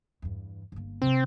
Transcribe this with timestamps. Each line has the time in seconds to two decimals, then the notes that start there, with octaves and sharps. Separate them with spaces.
0.22 E2 G2
0.72 G1 A#3
1.02 C3 D#3 C4